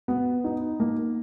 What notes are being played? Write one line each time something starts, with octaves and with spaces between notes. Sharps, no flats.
B3
D#4
A#3